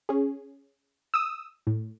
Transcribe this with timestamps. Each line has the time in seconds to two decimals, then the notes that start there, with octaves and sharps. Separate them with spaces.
0.09 C#4 G#4
1.14 D#6 E6
1.67 A2